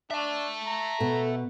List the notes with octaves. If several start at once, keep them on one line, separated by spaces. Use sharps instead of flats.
D4 E5 A5
A#5
B2 A4